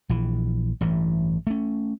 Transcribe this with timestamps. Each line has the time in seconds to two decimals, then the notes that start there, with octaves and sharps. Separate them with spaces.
0.09 A#1 E3
0.81 A1 G2 E3
1.47 A3 C#4